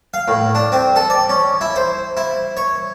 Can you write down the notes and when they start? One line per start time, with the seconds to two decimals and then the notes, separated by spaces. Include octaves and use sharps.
0.14 F5
0.28 A2
0.55 D4
0.72 C4
0.96 A4
1.10 D5
1.29 C#4
1.61 E4
1.76 C5
2.17 E4
2.57 C#5